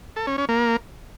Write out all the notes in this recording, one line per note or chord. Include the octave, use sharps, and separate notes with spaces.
A4
C#4
C#4
A#3